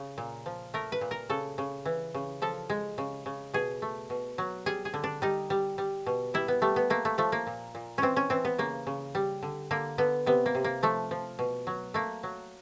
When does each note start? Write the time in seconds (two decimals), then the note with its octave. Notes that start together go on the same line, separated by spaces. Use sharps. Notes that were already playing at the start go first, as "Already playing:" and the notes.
Already playing: C#3
0.18 A#2
0.46 F3
0.74 A3 A#4
0.92 B4
1.01 A#2
1.11 A#4
1.30 C#3 A4
1.58 C#3
1.85 E3
2.14 C#3
2.42 F3 A4
2.70 G#3
2.98 C#3
3.26 C#3
3.54 B2 G#4
3.82 A3
4.10 B2
4.38 F#3
4.66 G3 G#4
4.85 G#4
4.94 D3
5.04 D4
5.22 G3 D#4
5.50 G3
5.78 G3
6.06 B2
6.34 G3 E4
6.48 B3
6.62 G3 A3
6.76 B3
6.90 A3 A#3
7.05 A3
7.18 F3 A3
7.32 A#3
7.47 A#2
7.75 A#2
7.98 E3 C4 C#4
8.16 C#4
8.30 E3 C4
8.45 B3
8.58 C#3 A#3
8.87 C#3
9.15 G3
9.43 D3
9.71 D3 A#3
9.98 D3 B3
10.26 C3 B3
10.46 A#3
10.55 C3
10.64 A#3
10.83 F3 A3
11.11 F3
11.39 B2
11.67 F#3
11.94 A3 A#3
12.23 F#3